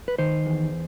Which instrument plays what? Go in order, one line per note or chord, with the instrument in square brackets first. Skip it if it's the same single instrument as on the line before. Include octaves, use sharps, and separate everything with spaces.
[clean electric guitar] B4
D#3 C5
E2